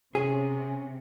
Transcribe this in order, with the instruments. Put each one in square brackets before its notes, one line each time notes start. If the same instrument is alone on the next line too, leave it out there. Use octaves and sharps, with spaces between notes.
[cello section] C3 [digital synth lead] C#4 [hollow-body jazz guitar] G#4